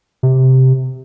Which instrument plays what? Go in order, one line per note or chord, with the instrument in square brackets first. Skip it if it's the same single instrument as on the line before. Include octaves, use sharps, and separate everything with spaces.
[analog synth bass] C3